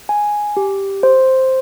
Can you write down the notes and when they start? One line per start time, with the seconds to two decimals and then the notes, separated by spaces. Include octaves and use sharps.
0.09 G#5
0.57 G4
1.03 C5